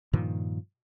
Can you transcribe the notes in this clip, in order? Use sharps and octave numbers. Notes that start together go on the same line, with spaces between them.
G2 A#2 D#3 F3